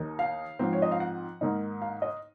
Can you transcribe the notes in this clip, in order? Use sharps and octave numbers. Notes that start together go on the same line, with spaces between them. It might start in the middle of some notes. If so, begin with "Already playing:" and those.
Already playing: D#2 D#3 A#3 D#4
F5
G#2 F3 C4
C#5
D#5
F5
F#5
G#2 D#3 A#3 D#4
F5
D#5